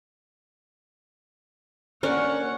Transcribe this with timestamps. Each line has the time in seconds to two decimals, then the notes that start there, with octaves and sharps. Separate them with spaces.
2.03 A#3 C#4 D4 A#4 C#5 F#5